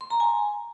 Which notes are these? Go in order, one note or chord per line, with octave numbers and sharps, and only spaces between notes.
C6
A#5
G#5